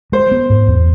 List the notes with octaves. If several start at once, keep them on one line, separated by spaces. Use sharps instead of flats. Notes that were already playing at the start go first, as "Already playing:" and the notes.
G#3 C5
B3
G#2
E2